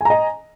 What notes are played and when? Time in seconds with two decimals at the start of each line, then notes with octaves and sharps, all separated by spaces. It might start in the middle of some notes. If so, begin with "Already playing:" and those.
0.01 G#5
0.05 A#5
0.10 D#5